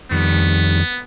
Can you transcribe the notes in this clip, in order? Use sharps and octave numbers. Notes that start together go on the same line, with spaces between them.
F2 D#3 G3 B3